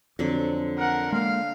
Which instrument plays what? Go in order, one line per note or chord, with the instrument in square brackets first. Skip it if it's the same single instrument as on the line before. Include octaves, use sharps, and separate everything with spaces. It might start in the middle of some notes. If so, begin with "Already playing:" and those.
[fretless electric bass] F2 [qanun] D3 F#3 C4
[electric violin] A#4 F#5
[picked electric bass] G#3 A#3 [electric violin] F5